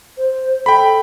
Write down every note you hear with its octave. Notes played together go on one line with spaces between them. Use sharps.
C5
A4 G5 B5